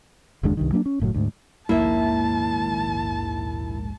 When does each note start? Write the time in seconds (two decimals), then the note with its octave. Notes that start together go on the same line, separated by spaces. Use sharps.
0.43 F#1 D#2 G#3 D4
0.57 C2 G2 D#3
0.73 F#3 A#3 C4 D4
0.86 C#4
1.00 F#1 A2 C#3 F#3
1.14 D2 G#2
1.69 A#1 D#2 G#2 A#3 E4 C#5 E5 A5